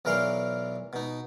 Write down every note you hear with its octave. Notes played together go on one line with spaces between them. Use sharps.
B1 E3 A#4 D5 F5 C6
B2 D#4